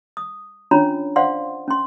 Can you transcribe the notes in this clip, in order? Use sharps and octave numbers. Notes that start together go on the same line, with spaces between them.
D#6
C#4 D4 F4 C#5 A#5 B5
C5 D5 F5 F#5 C6
C#4 C6